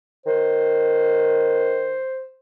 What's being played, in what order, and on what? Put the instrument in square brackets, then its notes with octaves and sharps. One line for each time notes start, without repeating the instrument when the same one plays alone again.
[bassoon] D#3 [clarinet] C5